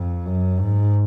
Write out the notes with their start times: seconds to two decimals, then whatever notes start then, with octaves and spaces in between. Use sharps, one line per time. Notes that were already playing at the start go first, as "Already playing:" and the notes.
Already playing: F2
0.26 F#2
0.60 G#2